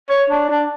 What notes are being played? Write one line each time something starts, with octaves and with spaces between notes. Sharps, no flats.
C#5
D4
D4